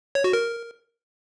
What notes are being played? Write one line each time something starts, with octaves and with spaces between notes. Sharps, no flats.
C#5
F#4
A#4